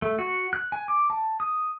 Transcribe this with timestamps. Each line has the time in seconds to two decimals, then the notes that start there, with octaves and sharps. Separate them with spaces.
0.02 A3
0.19 F#4
0.53 F#6
0.72 G#5
0.88 D6
1.10 A5
1.40 D#6